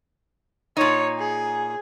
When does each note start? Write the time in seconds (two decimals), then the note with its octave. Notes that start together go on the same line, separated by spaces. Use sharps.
0.77 A#2 D#4 C#5
1.19 G#4